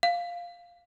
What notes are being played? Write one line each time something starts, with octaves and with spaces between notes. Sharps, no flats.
F5